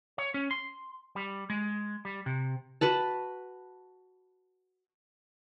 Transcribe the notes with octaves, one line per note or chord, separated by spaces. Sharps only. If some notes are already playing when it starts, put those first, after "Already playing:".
C#5
C#4
C6
G3
G#3
G3
C3
F#4 B4 F#5 A5